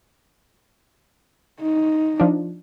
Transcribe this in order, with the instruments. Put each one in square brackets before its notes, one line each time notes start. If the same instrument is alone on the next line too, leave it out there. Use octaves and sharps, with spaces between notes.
[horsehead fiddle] D#4
[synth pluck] F3 D4